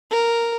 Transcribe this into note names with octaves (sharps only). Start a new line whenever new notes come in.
A#4